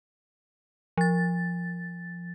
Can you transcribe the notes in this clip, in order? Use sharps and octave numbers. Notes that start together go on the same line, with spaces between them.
F3 A6